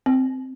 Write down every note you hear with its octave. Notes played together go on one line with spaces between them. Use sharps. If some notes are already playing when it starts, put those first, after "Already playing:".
C4